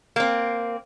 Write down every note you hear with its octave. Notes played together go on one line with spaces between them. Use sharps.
A#3 C4